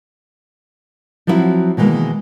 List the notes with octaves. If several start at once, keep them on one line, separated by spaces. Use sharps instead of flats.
F3 F#3 B3 C4 E4 F#4
B2 D#3 E3 G#3 A#3